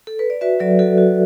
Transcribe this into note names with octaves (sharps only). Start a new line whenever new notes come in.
A4
B4
D5
F#4 B4 E5
F#3 A4 D5
F#4 A4
F#4